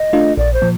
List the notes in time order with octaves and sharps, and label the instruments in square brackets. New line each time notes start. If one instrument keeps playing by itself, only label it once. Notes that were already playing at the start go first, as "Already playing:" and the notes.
Already playing: [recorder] D#5
[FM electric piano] A3 D4 F4
[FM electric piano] A#1 [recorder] D5
[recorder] C5
[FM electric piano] A#2 F3